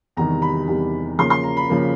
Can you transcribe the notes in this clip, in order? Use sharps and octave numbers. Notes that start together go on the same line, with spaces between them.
E2 C3 D#3 G3 A#5
B5
E2 C3 D#3 G3
C#3 F3 A#3 C6
C6
A#5
B5
C#3 F3 A#3